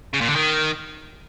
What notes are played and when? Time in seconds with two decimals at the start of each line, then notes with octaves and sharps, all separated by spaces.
0.13 C#3
0.21 A#2
0.28 D3
0.36 D#3